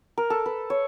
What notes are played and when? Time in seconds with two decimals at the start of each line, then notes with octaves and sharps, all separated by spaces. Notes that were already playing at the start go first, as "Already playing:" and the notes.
0.17 A#4
0.30 A4
0.46 B4
0.70 C#5